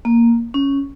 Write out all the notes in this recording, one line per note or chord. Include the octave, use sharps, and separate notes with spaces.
A#3
C#4